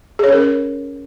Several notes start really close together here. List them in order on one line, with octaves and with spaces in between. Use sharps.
G#4 C#5 C#4 A#4